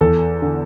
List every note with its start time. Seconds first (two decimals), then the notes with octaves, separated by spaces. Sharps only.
0.01 E2 A4
0.42 D3